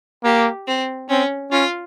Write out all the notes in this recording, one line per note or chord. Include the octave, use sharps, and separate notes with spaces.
A#3 G4
C4
C4 C#4
C#4 F4